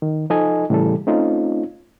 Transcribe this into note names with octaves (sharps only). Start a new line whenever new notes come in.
D#3
F3 D#4 A4 D#5 G#5
A2 C#3 E3 G3 G#4 A4
A3 C4 C#4 D#4 F4